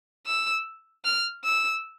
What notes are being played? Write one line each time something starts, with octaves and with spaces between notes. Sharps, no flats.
E6
F6
E6